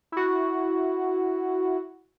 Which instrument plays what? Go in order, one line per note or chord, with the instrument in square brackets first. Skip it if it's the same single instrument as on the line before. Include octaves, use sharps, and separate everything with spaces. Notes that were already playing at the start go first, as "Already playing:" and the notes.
[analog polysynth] E4 F#4